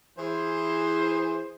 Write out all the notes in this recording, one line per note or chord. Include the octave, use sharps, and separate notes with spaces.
E3 G#4 C5